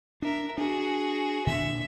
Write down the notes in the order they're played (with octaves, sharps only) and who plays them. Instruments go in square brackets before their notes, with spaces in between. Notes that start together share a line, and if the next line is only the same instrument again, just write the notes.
[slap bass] D4 [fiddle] A#4 E5
[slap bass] D4 [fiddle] F#4 G#4
[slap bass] A#2 D3 D4 [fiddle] E5